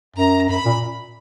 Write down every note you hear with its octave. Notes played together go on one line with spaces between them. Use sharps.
F#2 A#5
F#2 B5
A#2